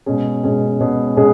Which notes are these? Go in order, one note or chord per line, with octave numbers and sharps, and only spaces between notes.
B2 G#3 C#4 G#4
B2 G#3 C#4 G#4
B2 G#3 C#4 G#4
B2 G#3 C#4 G#4